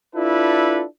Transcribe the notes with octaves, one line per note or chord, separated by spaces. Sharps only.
D4 E4 F4 A4 B4